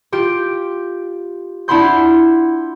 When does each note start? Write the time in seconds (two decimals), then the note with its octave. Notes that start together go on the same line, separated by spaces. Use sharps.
0.12 F4 G4 D7
1.68 D4 E4 F#5 B5 C6 G6